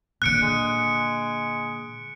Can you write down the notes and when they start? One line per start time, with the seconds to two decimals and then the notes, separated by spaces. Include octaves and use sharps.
0.22 A#2 D3 F#6 C#7 D7
0.42 G#3